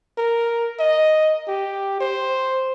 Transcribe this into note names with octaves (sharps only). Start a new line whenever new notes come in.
A#4
D#5
G4
C5